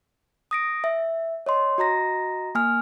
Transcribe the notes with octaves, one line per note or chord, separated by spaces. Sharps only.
D#6 A#6 D7
E5
C#5 D#5 C6
F#4 D#5 A#5 A#6
A#3 G#5 F6